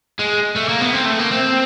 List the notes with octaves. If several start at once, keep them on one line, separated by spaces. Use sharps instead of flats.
G#3
A3
A#3
B3
C4
A3
A#3
C4